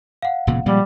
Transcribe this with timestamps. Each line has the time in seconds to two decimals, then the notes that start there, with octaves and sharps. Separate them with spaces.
0.22 F5 F#5
0.47 E1 A#2 C#3
0.66 A#2 F3 G3 G#3